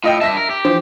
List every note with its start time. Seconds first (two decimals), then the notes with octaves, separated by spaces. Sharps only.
0.04 A2 F4 D#5 G5
0.21 G2 E5 A5 A#6 B6
0.37 A#4
0.50 G4
0.65 E3 F3 C5